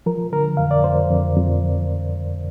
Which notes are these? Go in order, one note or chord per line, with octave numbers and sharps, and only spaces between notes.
F3 A#4
D3 A#4
F2 F5
D5
F2 C5
F2
F2